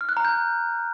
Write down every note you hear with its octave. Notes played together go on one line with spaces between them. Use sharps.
F6
F#6
A#5
G6